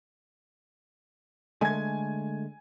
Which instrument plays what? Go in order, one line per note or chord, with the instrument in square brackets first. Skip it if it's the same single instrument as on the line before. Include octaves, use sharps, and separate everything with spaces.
[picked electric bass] D3 G#3 A3 [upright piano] G#5 G#6